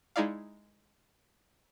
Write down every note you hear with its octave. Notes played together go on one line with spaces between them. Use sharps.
G#3 D#4 E4 D5 F5